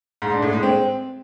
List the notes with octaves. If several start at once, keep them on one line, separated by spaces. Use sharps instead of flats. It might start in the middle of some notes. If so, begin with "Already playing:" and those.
G#2
D4
A2
G#3
C4